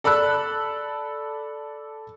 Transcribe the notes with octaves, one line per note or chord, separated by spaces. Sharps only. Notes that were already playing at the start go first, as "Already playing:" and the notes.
A4 D5 B5 E6 F#6